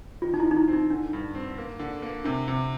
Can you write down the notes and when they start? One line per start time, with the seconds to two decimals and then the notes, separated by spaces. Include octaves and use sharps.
0.22 D#3 F4
0.34 D#4
0.40 E4
0.44 D#3
0.51 D#4
0.56 E4
0.68 C4
0.73 D#4
0.90 D3 D4
1.13 G2
1.35 C4
1.58 A#3
1.79 D3
2.02 A#3
2.24 C3 D4
2.48 C3